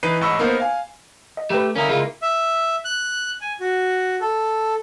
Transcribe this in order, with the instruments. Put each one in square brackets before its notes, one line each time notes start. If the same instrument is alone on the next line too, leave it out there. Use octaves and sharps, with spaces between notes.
[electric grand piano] E3 D#4 B4 C7 D#7
A1 G#2 D#5 B5 C#6 E6
A#3 B3 D#4 A#4 C5
F5 G#5
[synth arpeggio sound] D#5
[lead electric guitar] A3 [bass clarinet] G4 [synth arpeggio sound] B4 A#5
[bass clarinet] D3 [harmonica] A#3 E4 A#4 [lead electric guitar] C#4 D#4
[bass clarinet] C#3 [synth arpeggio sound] G#3 [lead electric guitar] D#4 F4
[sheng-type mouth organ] E5
F#6
G#5
F#4
A4